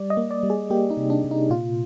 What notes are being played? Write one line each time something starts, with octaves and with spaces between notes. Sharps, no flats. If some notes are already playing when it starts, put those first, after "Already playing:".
Already playing: G3 D5
D#5
A#3
D5
G3
G#4
A#3 G4
D#4
C3
D4
C3
D#4
A#2 F4